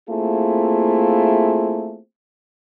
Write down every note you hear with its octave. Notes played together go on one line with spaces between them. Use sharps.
A3 A#3 C4 E4 F4 G#4